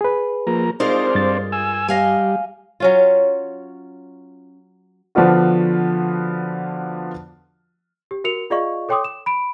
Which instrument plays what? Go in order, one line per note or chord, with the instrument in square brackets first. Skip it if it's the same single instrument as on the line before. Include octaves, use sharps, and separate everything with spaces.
[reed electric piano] G#4 B4
[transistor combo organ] F3 A#3 A#5
[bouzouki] G#3 F4 A#4 [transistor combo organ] C4 C5 D5 [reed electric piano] D#4
[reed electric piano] G2 A6
[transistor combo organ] G#5 E6
[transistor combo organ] G3 [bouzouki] D#5 F5 G#5
[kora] F#3 C#4 F4
[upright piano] D3 F3 B3 D4 F4 F#4
[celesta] G4
F#4 A#4 C#7 F7
F4 G#4 D5 D#5 F5 C#6
A4 C#5 G5 C6 D6 D#6
E7
B5 D7